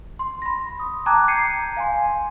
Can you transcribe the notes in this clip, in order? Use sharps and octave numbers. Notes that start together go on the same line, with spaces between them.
C6
B5 A#6
D#6
G5 A5 A#5 D6 F#6 G#6
G6 G#6 C7 C#7 D#7
F5 G#5 C6